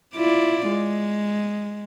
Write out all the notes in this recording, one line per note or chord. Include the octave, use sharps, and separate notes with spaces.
E4 F4 D5
G#3